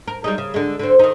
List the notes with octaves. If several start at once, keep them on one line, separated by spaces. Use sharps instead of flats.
A#4
G3 G#3 D#4
C#3
D3 G#3
D3 C4
D#3 D#4